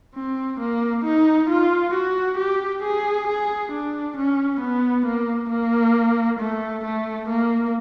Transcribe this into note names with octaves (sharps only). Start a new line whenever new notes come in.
C4
A#3
D#4
F4
F#4
G4
G#4
G#4
D4
C#4
B3
A#3
A#3
A3
A3
A#3